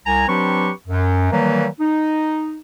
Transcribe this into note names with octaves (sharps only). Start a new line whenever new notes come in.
C2 G#5 A#5
F#3 C4 D4 G4 B4 C#6
F#2
D#3 E3 F#3 G3 A#3
D#4